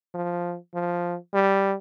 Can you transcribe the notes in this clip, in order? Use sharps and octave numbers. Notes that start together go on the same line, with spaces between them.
F3
F3
G3